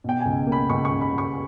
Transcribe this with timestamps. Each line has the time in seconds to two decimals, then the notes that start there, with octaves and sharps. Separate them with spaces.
0.04 B2 G5
0.20 C#2 G#5
0.47 A#3
0.52 B5
0.70 C#2 C#6
0.85 C#6
0.91 C#2
1.01 B5
1.12 C#2
1.18 C#6